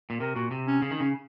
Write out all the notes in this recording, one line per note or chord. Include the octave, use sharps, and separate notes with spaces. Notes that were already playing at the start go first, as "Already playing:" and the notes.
A#2
C3 A#4
A#2 F#4
C3
C#4
C#3 C#4
D#3
C#3 C#4